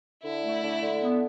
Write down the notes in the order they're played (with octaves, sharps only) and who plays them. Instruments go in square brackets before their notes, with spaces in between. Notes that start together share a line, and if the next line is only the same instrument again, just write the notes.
[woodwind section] D3 [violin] E4
[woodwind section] A3
D3
D3
B3